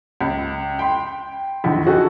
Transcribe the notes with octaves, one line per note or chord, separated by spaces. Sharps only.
C#2
G5 B5 C6
A#1 E2 D#3
D#4 F#4 G#4 A4